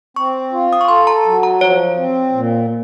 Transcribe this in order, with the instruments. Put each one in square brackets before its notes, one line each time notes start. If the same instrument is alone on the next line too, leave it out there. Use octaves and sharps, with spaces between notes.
[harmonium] C4 [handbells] C#6
[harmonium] F4
[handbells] D#6
C#6
[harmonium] A4 [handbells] C6
[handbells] A#5
[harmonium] F#3
[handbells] A#5
[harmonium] F3 [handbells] C#5
[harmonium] C4
A#2